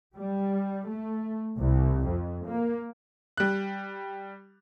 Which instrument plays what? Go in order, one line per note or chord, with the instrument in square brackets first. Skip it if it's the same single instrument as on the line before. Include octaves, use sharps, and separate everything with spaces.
[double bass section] G3
A3
C2
F2
A#3
[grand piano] G3 F#6